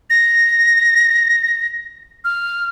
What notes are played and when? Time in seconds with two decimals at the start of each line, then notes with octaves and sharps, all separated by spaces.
0.10 A#6
2.24 F6